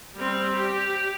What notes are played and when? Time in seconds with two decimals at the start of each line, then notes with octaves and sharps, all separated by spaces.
0.16 G3 C4
0.56 G4